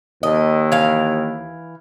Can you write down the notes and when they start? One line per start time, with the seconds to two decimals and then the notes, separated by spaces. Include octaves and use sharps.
0.23 D#2 D#5
0.72 E3 F5